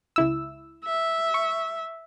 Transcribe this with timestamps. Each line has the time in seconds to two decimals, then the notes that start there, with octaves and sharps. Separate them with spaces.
0.16 C#2 E4 E6
0.85 E5
1.34 C#6